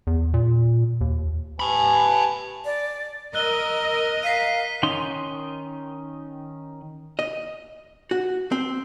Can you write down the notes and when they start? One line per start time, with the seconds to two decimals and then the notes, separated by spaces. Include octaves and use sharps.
0.07 E2
0.34 A#2
1.01 D#2
1.60 G4 B4 G#5 A5 B5
2.65 D5
3.35 A#4 D#5 E6 F#6 G7
4.23 F5 B6 C7 D#7
4.83 D#3 C#4 D#4 C6
7.19 D#5
8.11 F#4
8.52 C4